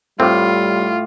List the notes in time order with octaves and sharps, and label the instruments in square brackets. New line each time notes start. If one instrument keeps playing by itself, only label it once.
[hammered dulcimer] A2 D6 [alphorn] G3 [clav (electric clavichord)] C4 [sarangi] F4